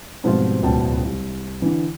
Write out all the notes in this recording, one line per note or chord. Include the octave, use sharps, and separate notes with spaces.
G#2 B2 F3 G3 C4 F4
D1 C#2 B2 G5 A5
C2
D3 E3